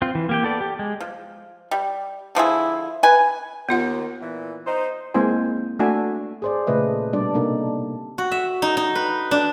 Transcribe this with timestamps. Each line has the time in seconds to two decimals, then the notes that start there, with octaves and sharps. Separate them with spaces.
0.02 C4 F4
0.15 E3
0.29 A#3 G4 G5
0.43 B3 A4 D5
0.61 G4
0.79 G#3
1.00 F3
1.71 G3
2.35 D3 F3 E4 G#4
3.03 B4 G#5
3.69 D#2 D#3 B3 F4 F#5
4.20 A#2 E3
4.66 D#4 C5
5.14 G#3 A#3 C4 E4 C5 G#5
5.79 A3 D4 F#4 E5 G#5
6.42 G#4 C5 D5
6.67 A#2 C#3 A3 B4 D#5
7.13 B2 G3 D4 D5
7.34 C3 A#3 D4 D#4 A4
8.18 F#4
8.32 E5
8.62 D#4
8.77 D#4
8.95 B4
9.31 D4